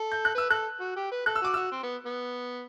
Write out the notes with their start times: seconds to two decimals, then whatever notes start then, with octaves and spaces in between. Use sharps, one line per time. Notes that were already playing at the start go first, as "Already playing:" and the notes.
Already playing: A4
0.12 G6
0.25 F#6
0.35 B4 E6
0.50 A4 F#6
0.80 F#4
0.96 G4
1.11 B4
1.26 A4 F#6
1.35 E6
1.41 F#4 D6
1.54 F#4 E6
1.72 C4
1.83 B3
2.06 B3